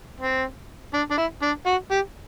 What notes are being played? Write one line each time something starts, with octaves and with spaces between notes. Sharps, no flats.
C4
D4
D4
E4
D4
F#4
G4